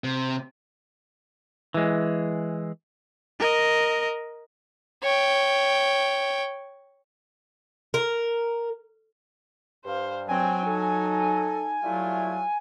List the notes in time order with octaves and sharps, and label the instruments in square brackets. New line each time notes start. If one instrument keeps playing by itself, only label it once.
[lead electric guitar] C3
[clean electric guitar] E3 G#3
[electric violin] A#4 D#5
[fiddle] C#5 G5
[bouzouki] A#4
[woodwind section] G2 [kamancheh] C5 F5
[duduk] F#3 [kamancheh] C4 G5 [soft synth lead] G#5
[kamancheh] D#4 [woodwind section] A4
[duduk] F#3 [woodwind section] G3 A3 E4 [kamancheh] F4